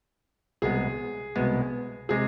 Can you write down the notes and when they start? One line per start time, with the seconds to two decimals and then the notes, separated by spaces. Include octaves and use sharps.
0.62 C2 B2 G#3 B3 G#4
1.35 C2 B2 G#3 B3
2.09 C3 G#3 G#4